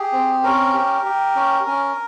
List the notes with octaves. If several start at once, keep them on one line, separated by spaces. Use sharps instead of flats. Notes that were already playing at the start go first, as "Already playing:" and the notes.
Already playing: G4 G#4
C4
C#4 A#4
G4
G4
C#4
C#4